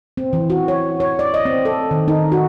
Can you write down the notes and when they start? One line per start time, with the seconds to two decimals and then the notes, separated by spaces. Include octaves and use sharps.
0.17 C4
0.33 E3
0.50 F#4
0.68 C#5
1.00 C#5
1.19 D5
1.34 D#5
1.46 C4
1.65 A4
1.91 D#3
2.08 D#4
2.32 F#4